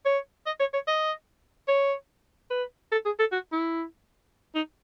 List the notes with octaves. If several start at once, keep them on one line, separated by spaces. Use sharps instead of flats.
C#5
D#5
C#5
C#5
D#5
C#5
B4
A4
G#4
A4
F#4
E4
D#4